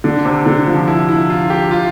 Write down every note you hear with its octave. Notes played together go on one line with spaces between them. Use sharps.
D3
C3
D3
F3
E4
E4
F4
G4
F4